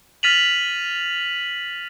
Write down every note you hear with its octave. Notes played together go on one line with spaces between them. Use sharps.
F6 A6 B6 D#7 F7 F#7